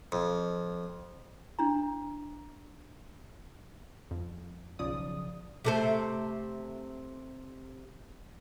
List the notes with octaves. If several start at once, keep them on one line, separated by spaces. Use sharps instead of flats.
F2
D4 E4 A#5
F2
B1 C#3 F3 D5 D#6
C3 A3 C4